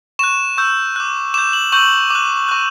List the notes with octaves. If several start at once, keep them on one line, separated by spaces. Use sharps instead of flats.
C#6 F#6 E7
C#6 E6 G6
D6 F#6
D6 G6 E7
F#7
C#6 E6 G6 F#7
D6 F#6
C#6 F#6